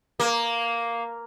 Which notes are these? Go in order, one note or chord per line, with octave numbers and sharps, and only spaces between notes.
A#3